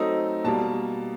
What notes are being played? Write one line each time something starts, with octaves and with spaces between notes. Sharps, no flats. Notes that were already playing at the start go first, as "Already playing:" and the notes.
Already playing: F#3 A3 C4 D#4 D#5
B2 G3 A#3 A5